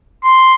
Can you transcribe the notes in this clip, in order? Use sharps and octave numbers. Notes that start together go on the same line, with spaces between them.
C6